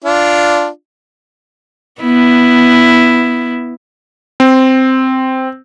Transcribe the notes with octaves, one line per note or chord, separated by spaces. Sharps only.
D4 F4
B3 E4
C4